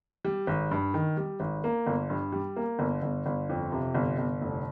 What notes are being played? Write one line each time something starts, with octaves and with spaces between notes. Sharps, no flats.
G3
G#1
G2
D#3
G3
G#1
A#3
G1
G2
G3
A#3
G1
G1
G1
F2
C3
G1
G1
F1